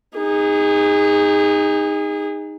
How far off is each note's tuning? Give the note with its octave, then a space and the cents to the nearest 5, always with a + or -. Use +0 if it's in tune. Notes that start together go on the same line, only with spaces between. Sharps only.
D#4 +0 G#4 -30